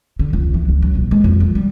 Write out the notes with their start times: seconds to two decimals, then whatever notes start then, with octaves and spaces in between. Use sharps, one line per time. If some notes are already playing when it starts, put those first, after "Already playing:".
0.19 D3
0.33 C#2
0.54 E3
0.69 C#2
0.82 F#3
0.95 A#1
1.11 G#3
1.24 F2
1.40 F3
1.55 G3